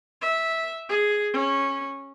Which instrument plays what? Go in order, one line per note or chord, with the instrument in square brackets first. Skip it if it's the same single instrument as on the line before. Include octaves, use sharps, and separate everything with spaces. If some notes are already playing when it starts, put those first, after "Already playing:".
[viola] E5
G#4
C#4